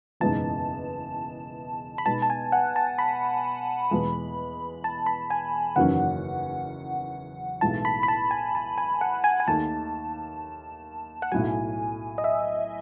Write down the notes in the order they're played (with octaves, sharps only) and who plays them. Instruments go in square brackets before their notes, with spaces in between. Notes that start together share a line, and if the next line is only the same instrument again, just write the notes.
[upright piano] F#1 E2 B2 G#3 D#4 [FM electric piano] A5
[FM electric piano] B5
[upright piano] B2 G#3 B3 D#4 [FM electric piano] A5
[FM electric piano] A5
G#5
F#5
A5
B5
[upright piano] E2 B2 G#3
[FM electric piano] A5
B5
G#5
[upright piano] F#1 E2 D#3 F#3 C#4 [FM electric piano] F#5
[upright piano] B1 A2 E3 G#3 [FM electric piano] A5
[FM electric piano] B5
B5
A5
G#5
A5
G#5
F#5
G#5
G#5
[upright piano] D#2 D#3 A3 D#4 [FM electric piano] A5
[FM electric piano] F#5
[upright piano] B1 A2 F#3 [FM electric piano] G#5
[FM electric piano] D#5
E5